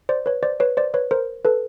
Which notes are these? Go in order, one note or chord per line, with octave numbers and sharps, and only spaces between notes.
C5 D5
B4 C#5
C5 D5
B4 C#5
C5 D5
B4 C#5
A#4 C5
A4 B4